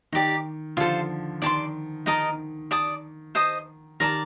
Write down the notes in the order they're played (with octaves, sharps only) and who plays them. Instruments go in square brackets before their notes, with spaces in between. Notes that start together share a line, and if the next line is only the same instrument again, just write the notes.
[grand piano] D#3 [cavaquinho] D#4 G4 D5
[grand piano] D3 F3 [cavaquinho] F4 A4 C5
[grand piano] D#3 [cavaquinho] D5 A5 C6
[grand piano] D#3 [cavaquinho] D#4 A#4 D#5 A5
[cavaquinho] D5 A5 D#6
C5 D#5 A5 D#6
[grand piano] D#3 [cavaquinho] A#4 D5 A5